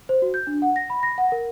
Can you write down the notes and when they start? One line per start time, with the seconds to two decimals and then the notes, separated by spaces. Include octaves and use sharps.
0.09 C5
0.22 F#4
0.34 G6
0.47 D4
0.62 F#5
0.76 A#6
0.90 B5
1.03 A#6
1.18 F#5
1.32 A#4